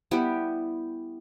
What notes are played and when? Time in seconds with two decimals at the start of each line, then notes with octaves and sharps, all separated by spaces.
0.11 G3 B3 E4 G4